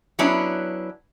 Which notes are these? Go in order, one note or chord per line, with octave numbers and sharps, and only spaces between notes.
F#3 B3 C#4 D4 E4